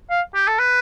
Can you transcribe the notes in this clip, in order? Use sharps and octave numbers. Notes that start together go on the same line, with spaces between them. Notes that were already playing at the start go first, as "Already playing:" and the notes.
F5
G4
A4
B4